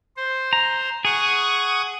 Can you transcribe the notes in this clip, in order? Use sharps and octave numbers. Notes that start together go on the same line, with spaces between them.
C5
A#5
G#4 F#5 C#6 D#6